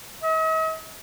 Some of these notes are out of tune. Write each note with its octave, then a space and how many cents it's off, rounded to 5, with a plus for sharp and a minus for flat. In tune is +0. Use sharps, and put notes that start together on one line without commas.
D#5 +45